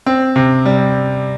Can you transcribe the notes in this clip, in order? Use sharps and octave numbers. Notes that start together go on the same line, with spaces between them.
C4
C3
G3